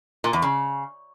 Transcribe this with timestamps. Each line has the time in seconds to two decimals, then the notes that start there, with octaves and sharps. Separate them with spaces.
0.24 A#2
0.33 E2
0.42 C#3